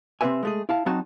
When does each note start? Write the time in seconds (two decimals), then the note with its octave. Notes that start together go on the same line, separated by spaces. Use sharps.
0.21 C3 C4 F#4 B4 E5 G#5
0.43 G#3 A3 G#4
0.69 E4 F5 A5
0.86 F#3 C4 D#4 F#4 A5